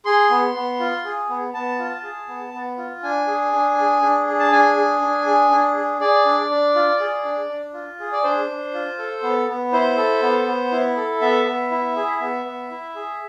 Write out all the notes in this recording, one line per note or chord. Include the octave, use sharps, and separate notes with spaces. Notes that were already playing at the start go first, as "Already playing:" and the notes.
G#4 C6
B3
B3
F4
G#4
B3
B3 A5
F4
G#4
B3
B3
F4
D4 G#5
G#4
D4
G#4
D4
G#4
A5
D4 G#5
G#4
D4
G#4
D4
G#4
G#4 D5
D4
D4
F4
G#4
D4
D4
F4
G#4
D5
D4 C5
D4
F4
A4
B3
B3
E4 C5
A4
B3
B3
E4
A4
B3 E5
B3
E4
G#4
B3
B3
E4
G#4